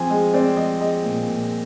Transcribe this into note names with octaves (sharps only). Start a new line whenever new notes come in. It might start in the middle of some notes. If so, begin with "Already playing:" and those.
Already playing: F3 C4 G#5
G#3 D#5
C4 D5
F3 D#5
G#3 D#5
A#2
A#2